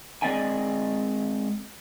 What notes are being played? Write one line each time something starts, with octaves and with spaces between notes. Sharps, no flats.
G#3 C4 D5 D#5 G5 G#5